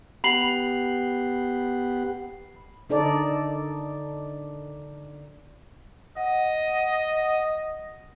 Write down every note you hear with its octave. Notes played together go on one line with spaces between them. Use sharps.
B3 G4 F#5 B5 C7 F#7
D3 D#4 A4 D5
D#5 F#5